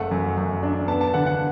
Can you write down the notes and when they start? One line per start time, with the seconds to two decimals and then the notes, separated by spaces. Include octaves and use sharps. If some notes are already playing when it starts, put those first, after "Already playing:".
Already playing: F#1 A3 F#5
0.11 F#2
0.37 F#2
0.63 D4
0.88 B3 A5
1.01 A5
1.14 D3 F#5
1.26 F#5